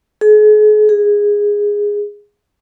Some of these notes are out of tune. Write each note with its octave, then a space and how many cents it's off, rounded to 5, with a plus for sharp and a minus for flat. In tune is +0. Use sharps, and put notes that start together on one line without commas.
G#4 +40
G#4 -10